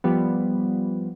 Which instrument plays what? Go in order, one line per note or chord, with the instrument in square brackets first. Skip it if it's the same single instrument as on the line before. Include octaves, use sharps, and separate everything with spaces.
[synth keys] F3 G3 B3